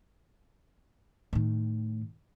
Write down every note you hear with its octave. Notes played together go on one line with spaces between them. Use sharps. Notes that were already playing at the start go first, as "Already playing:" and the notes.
A2 D#3